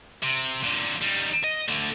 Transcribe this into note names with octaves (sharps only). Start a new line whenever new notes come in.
C3
A#2 D3
G3 D#4
D#5
D2 D3